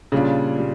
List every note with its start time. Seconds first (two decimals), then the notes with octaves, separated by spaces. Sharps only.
0.12 A#2 C#3 G3 D4 F4
0.58 A#2 G3